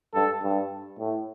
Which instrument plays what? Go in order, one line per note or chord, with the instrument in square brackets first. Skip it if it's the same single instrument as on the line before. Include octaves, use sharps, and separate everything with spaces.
[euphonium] G2 [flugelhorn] A4
[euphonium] G2
A2